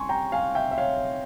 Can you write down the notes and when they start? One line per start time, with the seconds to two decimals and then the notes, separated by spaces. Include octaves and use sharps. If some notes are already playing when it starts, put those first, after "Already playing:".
Already playing: C3 G3 C#4 G#5 C6 C#6
0.09 G5 A#5
0.32 F5 G#5
0.55 E5 G5
0.71 E5
0.78 C#5 F5